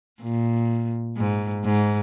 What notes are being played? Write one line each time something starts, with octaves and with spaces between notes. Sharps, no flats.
A#2
G#2
G#2